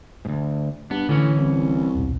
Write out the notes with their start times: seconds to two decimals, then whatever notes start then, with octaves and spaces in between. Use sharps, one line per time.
0.25 D2 G#2
0.91 G2 B3 D4
1.09 A2 D3 E3 C#4
1.37 C2
1.95 D#1 B1